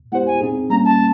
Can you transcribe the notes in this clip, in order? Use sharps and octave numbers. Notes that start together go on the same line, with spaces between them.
G#3 B3 E4 G4 C5 F#5
G#5
C4 D#4 G#4
G3 A#3 C#4 A#5
A5